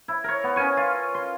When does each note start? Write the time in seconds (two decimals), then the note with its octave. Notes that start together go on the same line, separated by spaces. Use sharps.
0.08 E4
0.24 A#4 C#5
0.44 B3
0.56 C#4 A#4 G#5 C#6
0.77 F4
1.14 C6